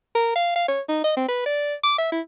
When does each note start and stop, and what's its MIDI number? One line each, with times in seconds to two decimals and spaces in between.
0.15 0.32 70
0.36 0.56 77
0.56 0.65 77
0.68 0.81 73
0.89 1.02 63
1.04 1.12 75
1.17 1.24 60
1.28 1.46 71
1.46 1.75 74
1.84 1.97 86
1.98 2.11 76
2.12 2.21 64